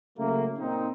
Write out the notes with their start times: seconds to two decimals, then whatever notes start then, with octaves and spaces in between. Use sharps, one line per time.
0.18 C#3 F#3 A3 A#3
0.59 A#2 C4 D#4